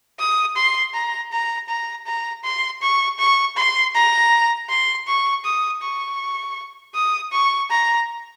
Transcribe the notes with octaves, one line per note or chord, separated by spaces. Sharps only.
D#6
C6
A#5
A#5
A#5
A#5
C6
C#6
C#6
C6
A#5
C6
C#6
D#6
C#6
D#6
C#6
A#5